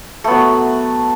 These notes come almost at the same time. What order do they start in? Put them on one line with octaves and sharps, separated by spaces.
A3 B3 F#3